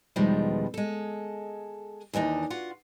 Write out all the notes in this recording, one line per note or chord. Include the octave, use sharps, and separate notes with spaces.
E2 B2 D#3 F3 G3 G#3
G#3 A4
D#2 E3 D4 D#4 D#5
F4 F#4 F#5